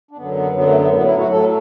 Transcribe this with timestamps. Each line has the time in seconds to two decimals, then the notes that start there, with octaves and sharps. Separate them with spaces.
0.11 D4
0.17 F#2 D3 F#3 B3
0.36 B3
0.55 F#2 D3 F#3 B3
0.68 A3
0.81 B3
0.93 A2 F#3 B3
1.07 E4
1.19 F#4
1.32 A2 F#3 A4